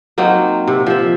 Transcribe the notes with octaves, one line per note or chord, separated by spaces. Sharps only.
F#3 A#3 C4 D#4
C3
F3 E5